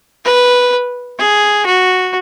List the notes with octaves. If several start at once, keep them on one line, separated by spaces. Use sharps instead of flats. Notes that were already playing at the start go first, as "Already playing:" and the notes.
B4
G#4
F#4